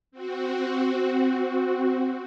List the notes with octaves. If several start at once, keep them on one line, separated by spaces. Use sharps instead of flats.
C4 F#4